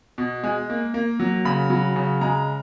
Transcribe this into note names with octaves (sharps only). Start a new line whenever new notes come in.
B2
G#3
A#3
A#3
F#3
C#3 B5
F#3
C#3
G#3 A#5